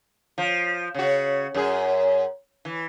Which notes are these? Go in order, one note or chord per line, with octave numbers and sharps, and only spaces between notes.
F3
C#3 F#4
F#2 G#4
E3